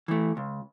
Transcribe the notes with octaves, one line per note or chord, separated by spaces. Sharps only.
E3 A3
C#2